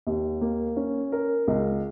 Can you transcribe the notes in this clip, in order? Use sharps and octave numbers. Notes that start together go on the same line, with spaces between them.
D#2
A#3
C#4
A#4
C#2